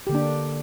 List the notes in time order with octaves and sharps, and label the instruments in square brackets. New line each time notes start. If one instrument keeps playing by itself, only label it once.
[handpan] G4
D3
A#3
D4